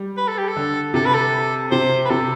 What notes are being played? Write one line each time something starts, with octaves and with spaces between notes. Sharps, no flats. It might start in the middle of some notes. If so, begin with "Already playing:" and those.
Already playing: G3
B4
A4
G4
A4
D3
C3 A4
B4
A4
C3 C5
B4
C3 A4